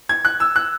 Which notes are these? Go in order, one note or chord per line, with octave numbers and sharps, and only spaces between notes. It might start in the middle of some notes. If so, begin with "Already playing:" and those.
G#6
F#6
E6
F#6